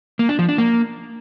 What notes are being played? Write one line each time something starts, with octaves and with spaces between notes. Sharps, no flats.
A#3
D4
F3
D4
A#3